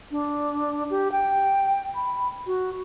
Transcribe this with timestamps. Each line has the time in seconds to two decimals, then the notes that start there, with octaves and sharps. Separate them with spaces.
0.11 D4
0.90 G4
1.12 G5
1.95 B5
2.46 F#4